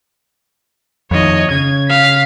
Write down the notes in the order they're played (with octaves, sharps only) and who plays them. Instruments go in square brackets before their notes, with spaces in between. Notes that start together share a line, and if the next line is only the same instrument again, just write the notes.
[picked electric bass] F2 D#3 [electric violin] C#5 D#5
[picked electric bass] C#3 [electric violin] G#6
[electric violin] F5 B6